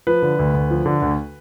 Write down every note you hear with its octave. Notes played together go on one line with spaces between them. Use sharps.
F3 B4
D3
D2
D2
F3
D3
D2